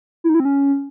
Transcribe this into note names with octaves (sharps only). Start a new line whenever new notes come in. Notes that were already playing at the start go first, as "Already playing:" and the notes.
E4
D#4
E4
C4
C#4